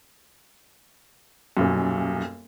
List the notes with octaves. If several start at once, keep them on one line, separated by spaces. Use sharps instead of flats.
D#1 B1 F#2